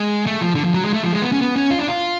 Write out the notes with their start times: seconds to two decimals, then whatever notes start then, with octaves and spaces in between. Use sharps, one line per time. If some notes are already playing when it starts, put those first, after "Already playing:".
Already playing: G#3
0.26 A3
0.41 F3
0.55 D3
0.64 F3
0.74 F#3
0.84 G#3
0.94 A3
1.03 F3
1.13 G#3
1.22 B3
1.32 C#4
1.41 B3
1.56 C#4
1.71 F4
1.79 D4
1.88 F4